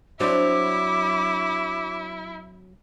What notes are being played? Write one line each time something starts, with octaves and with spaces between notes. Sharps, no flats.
F#3 C4 D4 E4 D6